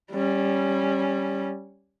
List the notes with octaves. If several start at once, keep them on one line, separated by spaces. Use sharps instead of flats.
G3 C#4